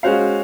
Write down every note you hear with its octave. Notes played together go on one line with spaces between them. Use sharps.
G#3 C#4 F#4 C5 F5